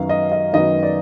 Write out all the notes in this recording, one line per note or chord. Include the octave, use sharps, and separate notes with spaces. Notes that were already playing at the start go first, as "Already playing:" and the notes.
Already playing: F#2 D#3 F#3 B3 F5
D#5
D#5
F#2 D#3 F#3 B3 D#5
D5